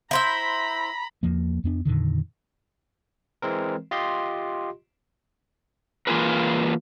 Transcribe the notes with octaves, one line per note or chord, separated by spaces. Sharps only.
E4 C5 E5 A#5 B5
E2 F3 A#3
F2 B3 D4
F2 A#2 D3 D#3
E3 G#3 C4 A#4
F4 G4 D#5 C6
E3 A#3 F4 G#4 A#4 B4